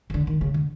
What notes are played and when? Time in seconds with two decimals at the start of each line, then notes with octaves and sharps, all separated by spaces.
0.10 C#3
0.14 D3
0.27 D#3
0.41 C#3
0.54 D3